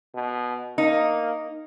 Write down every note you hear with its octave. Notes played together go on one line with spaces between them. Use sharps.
B2
A#3 D#4